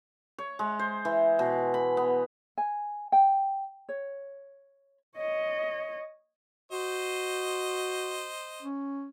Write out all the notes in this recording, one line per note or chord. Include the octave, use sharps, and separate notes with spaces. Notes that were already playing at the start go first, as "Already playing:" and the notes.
C#5
G#3
C5
E3
B2
B5
B3
G#5
G5
C#5
C#5 D#5
F#4 C5 D#5
C#4